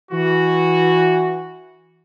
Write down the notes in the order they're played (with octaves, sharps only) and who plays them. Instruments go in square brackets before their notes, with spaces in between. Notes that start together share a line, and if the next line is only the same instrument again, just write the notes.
[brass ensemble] E3 F#4